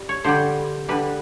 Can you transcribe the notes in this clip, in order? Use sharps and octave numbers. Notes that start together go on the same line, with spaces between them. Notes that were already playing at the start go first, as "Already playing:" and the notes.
Already playing: G3
C#5
D3 G3 C5
D3 G3 B4